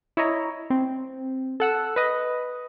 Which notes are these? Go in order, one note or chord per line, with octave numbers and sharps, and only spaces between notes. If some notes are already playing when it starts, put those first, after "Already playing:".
E4 C#5 D#5 A#5
C4
A4 F#5 E6
B4 D#5